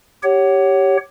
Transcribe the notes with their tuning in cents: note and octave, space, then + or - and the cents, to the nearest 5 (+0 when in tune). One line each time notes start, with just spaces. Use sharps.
G4 -5 C#5 +0 F#5 +25